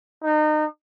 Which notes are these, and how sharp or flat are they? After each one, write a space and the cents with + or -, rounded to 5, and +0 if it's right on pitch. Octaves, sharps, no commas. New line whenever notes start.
D#4 -30